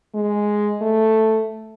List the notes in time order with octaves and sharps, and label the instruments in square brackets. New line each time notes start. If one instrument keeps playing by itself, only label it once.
[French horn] G#3
A3